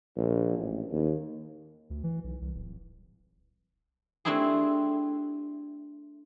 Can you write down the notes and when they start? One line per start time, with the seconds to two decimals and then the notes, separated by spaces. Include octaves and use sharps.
0.17 A#1
0.58 A1
0.92 D#2
1.90 D2
2.04 E3
2.24 B1
2.41 C2
2.54 D1
4.25 A3 C4 D4 E4 G4 G#4